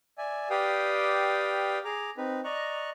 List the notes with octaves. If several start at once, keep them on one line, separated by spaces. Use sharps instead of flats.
D5 E5 G#5
G4 B4 D5 F5 G5 D#6
G#4 A#5 D6
C4 D#4 B4
D5 D#5 A#5 C#6 F#6